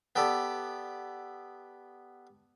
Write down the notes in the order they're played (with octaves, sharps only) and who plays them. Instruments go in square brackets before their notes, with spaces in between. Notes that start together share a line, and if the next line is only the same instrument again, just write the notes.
[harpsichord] B3 G4 A4 D5